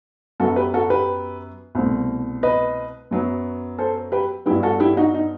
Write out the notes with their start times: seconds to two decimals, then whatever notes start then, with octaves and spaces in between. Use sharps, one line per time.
0.40 F#2 F#3 B3 F#4 A4
0.56 G4 B4
0.74 F#4 A4
0.90 G4 B4
1.75 C2 B2 A3 C4
2.43 B4 D#5
3.11 F#2 F#3 B3
3.79 A4 C5
4.12 G4 B4
4.46 G2 F#3 B3 E4 G4
4.63 F#4 A4
4.80 E4 G4
4.97 D#4 F#4
5.15 D#4